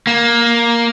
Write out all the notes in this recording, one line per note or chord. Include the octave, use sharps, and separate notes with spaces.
A#3